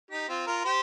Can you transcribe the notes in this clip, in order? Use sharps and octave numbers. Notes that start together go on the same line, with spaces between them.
D#4 G4
C4 F4
F4 A#4
G4 C5